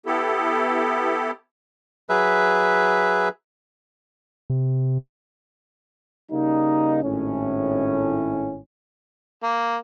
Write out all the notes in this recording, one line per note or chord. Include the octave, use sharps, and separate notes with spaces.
B3 E4 G4 A4
F#3 G#4 B4 E5
C3
C#3 G3 A#3 D#4
G#1 A2 C#4
A#3